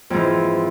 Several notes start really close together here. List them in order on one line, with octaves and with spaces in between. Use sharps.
F2 G#2 E3